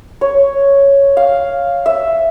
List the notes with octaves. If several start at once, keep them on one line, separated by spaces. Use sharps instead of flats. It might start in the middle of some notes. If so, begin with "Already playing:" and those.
C#5
F5
E5